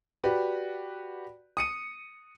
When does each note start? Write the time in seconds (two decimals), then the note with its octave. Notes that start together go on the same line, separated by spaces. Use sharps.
0.24 F#4 G4 B4 D5
1.57 D#6 C#7 D#7